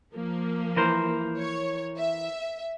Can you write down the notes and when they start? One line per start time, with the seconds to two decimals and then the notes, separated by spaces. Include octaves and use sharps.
0.13 F3 A#3
0.76 E3 A#4 C5
1.38 C#5
1.98 E5